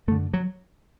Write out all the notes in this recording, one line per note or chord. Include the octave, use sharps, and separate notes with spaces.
F#2 D3 A3
F#3